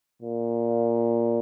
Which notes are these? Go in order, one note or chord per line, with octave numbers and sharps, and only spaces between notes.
A#2